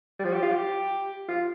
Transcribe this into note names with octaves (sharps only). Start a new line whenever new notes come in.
G3
F3
G4
F4
G4
F4